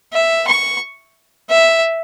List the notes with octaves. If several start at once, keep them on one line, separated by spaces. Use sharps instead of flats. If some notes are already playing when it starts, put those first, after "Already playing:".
E5
C#6
E5